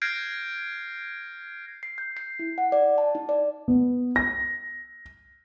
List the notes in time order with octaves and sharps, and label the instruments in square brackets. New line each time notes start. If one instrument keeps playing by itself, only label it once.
[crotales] F6 G6 G#6 A#6 C7 D7
[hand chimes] C7
G6
C7
E4
F#5
D5
A5
D#4
D5
[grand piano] B3
A#6